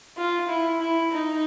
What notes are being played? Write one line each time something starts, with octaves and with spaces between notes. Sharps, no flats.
F4
E4
E4
D#4